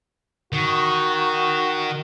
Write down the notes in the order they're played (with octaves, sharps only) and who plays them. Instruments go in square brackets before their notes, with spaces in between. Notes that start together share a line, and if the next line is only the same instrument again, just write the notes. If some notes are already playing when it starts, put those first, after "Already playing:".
[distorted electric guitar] D#3 [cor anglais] F#4